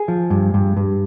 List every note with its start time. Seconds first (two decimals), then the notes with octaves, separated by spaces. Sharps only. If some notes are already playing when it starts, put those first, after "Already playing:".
Already playing: G#4
0.08 F3
0.30 G2
0.54 G2
0.77 G2